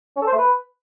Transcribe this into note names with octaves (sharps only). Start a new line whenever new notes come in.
C#4
A4
C5
A3
B4